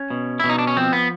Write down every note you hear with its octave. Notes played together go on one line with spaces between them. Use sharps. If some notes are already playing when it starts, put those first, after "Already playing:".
Already playing: C#4
B2
E4
B2
D#4
D4
C#4
F3 C4
B3